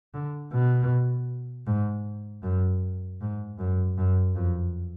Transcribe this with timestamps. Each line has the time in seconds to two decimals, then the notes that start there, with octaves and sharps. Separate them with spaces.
0.14 D3
0.53 B2
1.66 G#2
2.43 F#2
3.21 G#2
3.59 F#2
3.98 F#2
4.35 F2